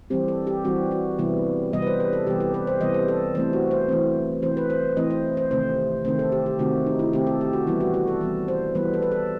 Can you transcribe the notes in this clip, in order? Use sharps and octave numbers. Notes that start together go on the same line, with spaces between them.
E3 G3 C4 G4
A4
G4
E3 G3 C4 F#4
F#4
C3 E3 G3 B3 E4
C3 E3 G3 B3 D#5
B4
C5
B4
A4
C3 E3 G3 B3 G4
G4
B4
C5
C3 E3 G3 B3 D#5
C5
A4
E3 A3 C4 C5
F#4
C5
E3 A3 C4
E3 A3 C4 C5
B4
C5
E3 A3 C4 D#5
C5
C5
C3 D#3 A3 C4 C5
C3 D#3 A3 C4 C5
A4
G4
G4
C3 D#3 A3 C4 F#4
D#4
E4
C3 D#3 A3 C4 G4
A4
G4
F#4
E3 G3 B3 E4
F#4
F#4
A4
E3 G3 B3
C5
E3 G3 B3 B4
A4
B4
A4